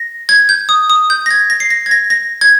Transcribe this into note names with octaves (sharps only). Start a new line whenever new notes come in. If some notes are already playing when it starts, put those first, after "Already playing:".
Already playing: A#6
G#6
G6
D#6
D#6
G6
A#6
G#6
A#6
C7
A#6
G#6
A#6
A#6
G#6